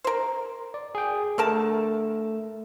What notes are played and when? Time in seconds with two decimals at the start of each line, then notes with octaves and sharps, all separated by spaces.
0.04 A#4 C5
0.74 D5
0.95 G#4 G5
1.38 D3 A3 A#4 A5